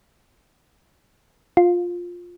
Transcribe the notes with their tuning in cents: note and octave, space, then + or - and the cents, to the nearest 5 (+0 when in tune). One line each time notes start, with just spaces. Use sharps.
F4 +10